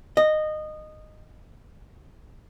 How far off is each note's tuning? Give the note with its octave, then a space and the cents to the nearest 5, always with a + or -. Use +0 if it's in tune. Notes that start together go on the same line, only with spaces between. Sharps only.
D#5 -15